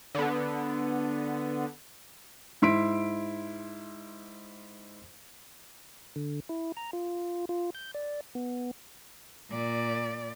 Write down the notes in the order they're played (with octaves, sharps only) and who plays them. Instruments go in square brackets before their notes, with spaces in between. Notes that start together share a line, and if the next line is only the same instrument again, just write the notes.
[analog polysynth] D3 B3
[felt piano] G#2 E4 C6 B6 D7
[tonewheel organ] D3
E4
A#5
F4
F4
G6
D5
B3
[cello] A#2 D5